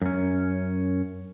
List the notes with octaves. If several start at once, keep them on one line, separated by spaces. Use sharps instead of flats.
F#2 C#4